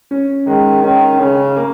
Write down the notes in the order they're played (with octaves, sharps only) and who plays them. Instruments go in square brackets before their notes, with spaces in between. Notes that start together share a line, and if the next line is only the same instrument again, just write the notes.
[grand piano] C#4
[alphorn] D#3 [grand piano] G#3
[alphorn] D#3 [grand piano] C#4
[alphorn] C#3 [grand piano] C#4
[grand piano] A#3